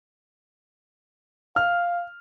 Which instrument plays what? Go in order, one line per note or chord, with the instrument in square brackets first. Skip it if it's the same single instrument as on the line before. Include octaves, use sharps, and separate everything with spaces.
[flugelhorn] F5 [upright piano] F6